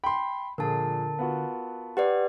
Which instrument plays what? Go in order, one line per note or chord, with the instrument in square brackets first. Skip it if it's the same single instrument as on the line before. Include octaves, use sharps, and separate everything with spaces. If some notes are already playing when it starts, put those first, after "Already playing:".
[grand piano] G5 C6 [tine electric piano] B5
[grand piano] A#2 F3 G#4 [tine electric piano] D3 [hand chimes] A#4 A5
[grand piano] B3 F4 F#4
[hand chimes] G4 B4 D5 [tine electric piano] F#5